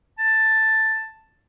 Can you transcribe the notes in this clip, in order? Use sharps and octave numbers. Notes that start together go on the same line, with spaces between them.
A5